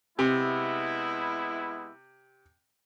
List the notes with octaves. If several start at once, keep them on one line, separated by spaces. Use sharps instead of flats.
C3 G#3 B3 E4